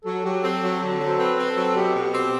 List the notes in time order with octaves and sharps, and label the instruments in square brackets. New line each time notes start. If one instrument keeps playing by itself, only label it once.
[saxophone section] F#3 [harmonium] A4
[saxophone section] F#3 [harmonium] G4
[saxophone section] C4 [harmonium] A4
[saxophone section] F#3
D3
F#3
[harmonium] C5
[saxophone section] C4 [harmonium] B4
[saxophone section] C4
[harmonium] A4
[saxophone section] F#3
[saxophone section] B2 [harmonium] G4
[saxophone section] B2
[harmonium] G4
[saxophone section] C4